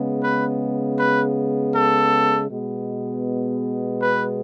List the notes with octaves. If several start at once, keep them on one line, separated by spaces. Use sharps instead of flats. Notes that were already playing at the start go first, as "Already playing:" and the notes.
Already playing: C#3 G#3 B3
B4
B4
A4
B2 G#3 B3
B4